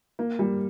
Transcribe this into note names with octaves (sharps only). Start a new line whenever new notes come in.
A#3
G3